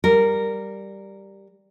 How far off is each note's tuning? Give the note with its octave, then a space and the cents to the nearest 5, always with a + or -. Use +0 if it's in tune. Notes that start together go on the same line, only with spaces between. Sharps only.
G3 +0 A#4 -10